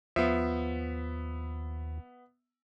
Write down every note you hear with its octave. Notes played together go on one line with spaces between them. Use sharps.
D#2 F3 B3 E5